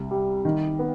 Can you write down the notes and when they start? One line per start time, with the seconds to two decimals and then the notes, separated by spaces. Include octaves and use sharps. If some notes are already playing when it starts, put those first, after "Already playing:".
Already playing: C2
0.11 G3
0.45 D#3
0.79 B3